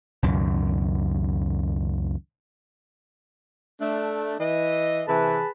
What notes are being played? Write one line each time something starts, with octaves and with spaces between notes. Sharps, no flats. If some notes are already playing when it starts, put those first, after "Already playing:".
C#2 F#2 B2 D#3
A3 D4
E3 D#5
C3 E3 G#4 B4 A5